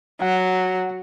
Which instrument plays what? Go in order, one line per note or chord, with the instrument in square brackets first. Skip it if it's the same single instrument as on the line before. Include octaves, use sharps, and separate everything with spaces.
[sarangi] F#3 [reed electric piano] F#5